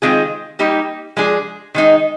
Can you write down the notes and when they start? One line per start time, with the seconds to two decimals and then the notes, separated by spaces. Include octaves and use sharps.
0.02 D#3 G#3 C4 F4 G#4
0.59 G3 A#3 D#4 G4
1.16 F3 G#3 D4 G#4
1.74 D#3 G#3 D#4